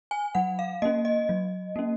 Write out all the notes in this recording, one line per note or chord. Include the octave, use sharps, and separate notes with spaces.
G#5
F#3 F#5
F5
A#3 C#4 D#5
D#5
F#3
A#3 C#4